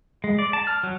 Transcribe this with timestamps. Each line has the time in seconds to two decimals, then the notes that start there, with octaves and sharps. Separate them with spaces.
0.24 G#3
0.39 D5
0.53 A5
0.67 F6
0.83 F#3